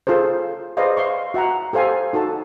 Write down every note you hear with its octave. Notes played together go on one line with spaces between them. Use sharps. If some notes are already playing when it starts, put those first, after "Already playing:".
F4 G#4 A4 C5
G#4 B4 C5 D5 D#5 F5
E5 F5 C6 C#6
F#4 E5 F#5 A#5
G4 A4 C5 F5 G#5
D#4 F#4 A4 A5